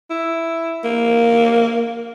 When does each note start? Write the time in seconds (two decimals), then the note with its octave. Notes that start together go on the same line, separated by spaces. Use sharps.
0.10 E4
0.84 A#3